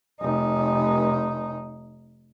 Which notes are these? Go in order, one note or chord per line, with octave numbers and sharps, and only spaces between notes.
F1 D#4